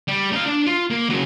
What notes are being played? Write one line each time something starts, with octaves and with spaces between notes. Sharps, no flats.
G3
D#4 F5
D4
F4
A#3
C#3 F#3